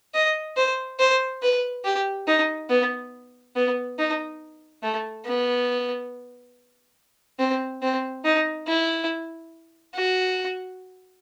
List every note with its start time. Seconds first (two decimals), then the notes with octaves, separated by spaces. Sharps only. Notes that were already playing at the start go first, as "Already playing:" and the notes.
0.14 D#5
0.57 C5
0.99 C5
1.43 B4
1.84 G4
2.28 D#4
2.70 B3
3.56 B3
3.98 D#4
4.83 A3
5.26 B3
7.39 C4
7.82 C4
8.24 D#4
8.67 E4
9.95 F#4